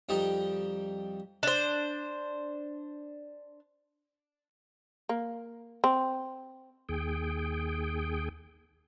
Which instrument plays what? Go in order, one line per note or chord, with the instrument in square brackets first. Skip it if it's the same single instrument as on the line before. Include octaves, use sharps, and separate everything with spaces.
[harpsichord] F2 G3 D#4 G4
[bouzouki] D4 C5
[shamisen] A#3
C4
[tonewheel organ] D#2 G#4 G5